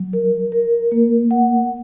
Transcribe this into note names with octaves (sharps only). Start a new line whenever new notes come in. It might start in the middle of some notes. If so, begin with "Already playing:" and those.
Already playing: F#3
A#4
A#4
A#3
F#5